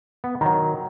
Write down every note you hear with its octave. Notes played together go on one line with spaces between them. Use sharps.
B3
D#3 F#3 A#5